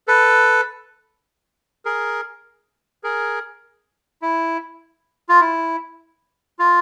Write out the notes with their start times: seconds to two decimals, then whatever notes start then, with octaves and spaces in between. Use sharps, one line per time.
0.08 A4 B4
1.85 G#4 A#4
3.04 G#4 A#4
4.22 E4
5.29 F4
5.41 E4
6.59 F4